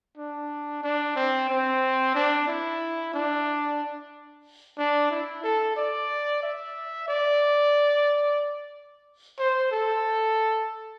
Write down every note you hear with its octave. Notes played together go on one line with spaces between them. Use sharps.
D4
D4
C4
C4
D4
E4
D4
D4
E4
A4
D5
E5
D5
C5
A4